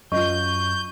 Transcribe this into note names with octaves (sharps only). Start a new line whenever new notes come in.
F#2 F4 D#5 C#6 G6